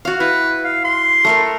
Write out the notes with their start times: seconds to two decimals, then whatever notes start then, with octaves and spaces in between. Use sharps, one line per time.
0.05 F#4 F5
0.20 E4 B4
0.64 F5
0.84 C6
1.25 A3 A4 A#4